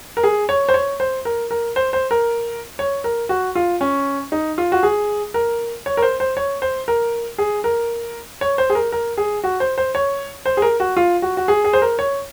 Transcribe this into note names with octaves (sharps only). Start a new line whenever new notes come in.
A#4
G#4
C#5
C5
C#5
C5
A#4
A#4
C5
C5
A#4
C#5
A#4
F#4
F4
C#4
D#4
F4
F#4
G#4
A#4
C#5
A#4
C5
C5
C#5
C5
A#4
G#4
A#4
C#5
C5
G#4
A#4
A#4
G#4
F#4
C5
C5
C#5
C5
G#4
A#4
F#4
F4
F#4
F#4
G#4
G#4
C5
A#4
C#5